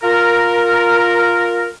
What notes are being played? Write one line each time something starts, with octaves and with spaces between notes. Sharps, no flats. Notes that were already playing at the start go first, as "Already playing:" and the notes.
F4 A#4